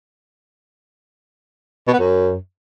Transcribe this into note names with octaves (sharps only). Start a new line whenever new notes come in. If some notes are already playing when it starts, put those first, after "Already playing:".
B2
B3
F#2